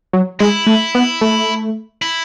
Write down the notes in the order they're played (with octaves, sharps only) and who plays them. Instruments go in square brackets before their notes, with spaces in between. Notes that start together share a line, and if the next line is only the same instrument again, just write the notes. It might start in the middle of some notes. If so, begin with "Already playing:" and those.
[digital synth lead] F#3
[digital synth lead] G#3 [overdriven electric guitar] E4
[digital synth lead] A3
B3
A3
[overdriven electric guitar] E4